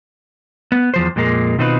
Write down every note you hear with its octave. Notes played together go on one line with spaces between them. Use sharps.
B3
E2 F3 C5
F2 A#2 G#3 A#3
B2 D#3 C4 D#4 F4 B4